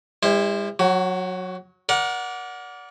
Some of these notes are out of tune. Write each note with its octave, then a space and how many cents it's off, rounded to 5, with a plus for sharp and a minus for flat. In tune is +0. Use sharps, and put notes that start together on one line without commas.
G3 +45 E4 +0 C5 +0
F#3 -15 F#4 +30
A#4 +25 D5 -20 F#5 -10